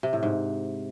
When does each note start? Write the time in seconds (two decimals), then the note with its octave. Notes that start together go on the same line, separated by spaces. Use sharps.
0.03 C3
0.13 A2
0.23 G#2